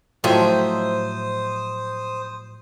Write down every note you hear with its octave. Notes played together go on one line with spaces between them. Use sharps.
A2 F3 F#3 C5 D#5 E5 G5 D#6